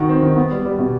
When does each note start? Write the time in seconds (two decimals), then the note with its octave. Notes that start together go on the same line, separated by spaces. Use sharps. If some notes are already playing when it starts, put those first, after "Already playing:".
Already playing: D#3 F#4
0.09 C4
0.22 D#3
0.36 B3
0.51 G3
0.65 G3
0.78 B2